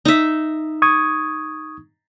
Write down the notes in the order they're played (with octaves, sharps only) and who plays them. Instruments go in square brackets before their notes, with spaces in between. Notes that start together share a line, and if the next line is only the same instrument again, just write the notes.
[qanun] D#4 E5
[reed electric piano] C#6 D#6 G#6